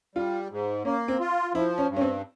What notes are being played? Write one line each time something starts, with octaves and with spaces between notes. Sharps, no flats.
G3 F4
G#2
A#3 C#4
C4
F4
F3 E4
C#4
G2
C#4
C4